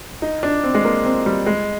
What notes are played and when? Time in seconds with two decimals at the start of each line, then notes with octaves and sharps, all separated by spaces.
0.22 D#4
0.43 D4
0.64 C4
0.75 G#3
0.85 A#3
1.05 C4
1.26 G3
1.46 G#3